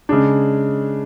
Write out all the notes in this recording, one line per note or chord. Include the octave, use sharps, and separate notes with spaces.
C#3 G#3 D4